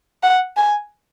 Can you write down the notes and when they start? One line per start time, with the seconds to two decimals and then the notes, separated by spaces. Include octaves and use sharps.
0.23 F#5
0.57 G#5